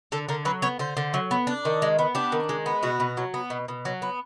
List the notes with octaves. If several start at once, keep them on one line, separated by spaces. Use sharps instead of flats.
D3 A4
D3 A#4
F#3 B4
B3 C#5
D3 C5
D3
F#3
B3
D4
D#3
G#3
B3
D4 G4
D#3
G#3
B3
B2 F#4
B2
F#3
B3
B2
B2
F#3
B3